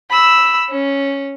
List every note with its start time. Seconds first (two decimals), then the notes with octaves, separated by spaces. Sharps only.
0.11 B5 E6
0.70 C#4